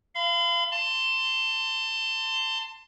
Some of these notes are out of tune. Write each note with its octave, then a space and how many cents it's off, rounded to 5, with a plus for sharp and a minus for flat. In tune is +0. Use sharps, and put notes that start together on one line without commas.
F5 -25 B5 +40
A5 +25 C6 -10